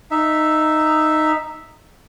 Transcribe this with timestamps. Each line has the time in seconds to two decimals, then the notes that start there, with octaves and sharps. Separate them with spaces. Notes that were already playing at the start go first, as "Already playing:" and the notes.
0.11 D#4 E5